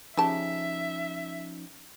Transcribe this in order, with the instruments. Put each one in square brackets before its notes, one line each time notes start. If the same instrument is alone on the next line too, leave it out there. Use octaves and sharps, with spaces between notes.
[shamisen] C#3 G4 A5 [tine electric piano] F3 C#4 D#4 [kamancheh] E5